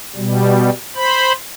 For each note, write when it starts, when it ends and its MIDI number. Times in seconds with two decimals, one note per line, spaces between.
0.16 0.70 47
0.16 0.70 55
0.96 1.32 72
0.96 1.32 83